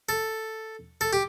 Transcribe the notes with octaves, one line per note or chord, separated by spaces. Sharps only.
A4
A4
G4